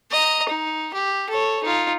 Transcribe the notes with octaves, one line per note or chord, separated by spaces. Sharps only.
D#5 A#5
D#4
G4
A4 C#5
D#4 F4